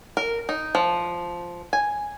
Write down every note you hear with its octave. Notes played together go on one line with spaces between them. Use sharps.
A#4
D#4
F3
G#5